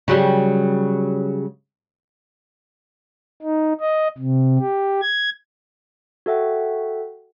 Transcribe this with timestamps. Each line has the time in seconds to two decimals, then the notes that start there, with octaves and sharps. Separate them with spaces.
0.08 C#3 F#3 G3
3.42 D#4
3.81 D#5
4.18 C3
4.59 G4
5.02 G#6
6.26 F#4 A4 E5 F#5 G5